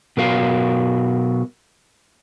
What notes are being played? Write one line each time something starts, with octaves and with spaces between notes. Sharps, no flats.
B2 F#3 A#4 F5